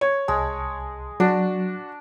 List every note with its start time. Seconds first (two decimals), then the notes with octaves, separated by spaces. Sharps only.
0.01 C#5
0.28 C2 G#3 A5
1.20 F#3 D4 F#4